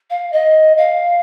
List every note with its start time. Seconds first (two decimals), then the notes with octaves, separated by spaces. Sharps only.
0.10 F5
0.32 D#5
0.78 F5